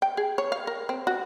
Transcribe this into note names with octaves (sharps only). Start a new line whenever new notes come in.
G5
G#4
C#5
F5
A#4
C4
F#4